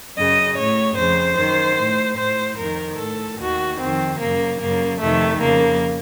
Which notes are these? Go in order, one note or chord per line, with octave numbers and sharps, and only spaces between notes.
F#2 C#3 D#5
A2 C#5
F2 C#3 C5
F#2 D#3
A2
A2 C5
F2 D#3 A#4
A2 A4
D#2 D#3 F#4
F2 D#3 C4
F#2 C#3 A#3
F#2 C#3 A#3
F2 C3 D#3 A3
F2 C#3 A#3